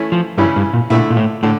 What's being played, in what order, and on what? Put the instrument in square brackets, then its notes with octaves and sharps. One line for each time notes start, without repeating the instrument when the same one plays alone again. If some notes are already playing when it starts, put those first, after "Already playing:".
Already playing: [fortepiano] E3 A3 C#4 E4
[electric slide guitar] F3
[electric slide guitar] G2 [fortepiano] C#3 E3 G3 C#4 E4
[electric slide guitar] G2
A#2
[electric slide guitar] A#2 [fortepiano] D3 A3 E4
[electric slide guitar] A#2
A2
[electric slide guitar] A2 [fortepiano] D3